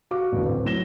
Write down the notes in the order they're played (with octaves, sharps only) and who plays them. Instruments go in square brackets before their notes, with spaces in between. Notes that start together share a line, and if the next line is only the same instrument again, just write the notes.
[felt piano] F#4 F5 D6
[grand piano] A1 D2 G2
[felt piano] C4
[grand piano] A2 E7 G7 [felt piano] F#3 A#6